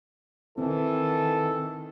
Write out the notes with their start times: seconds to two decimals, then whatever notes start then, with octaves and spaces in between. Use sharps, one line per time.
0.58 D#3 E3 C4 A4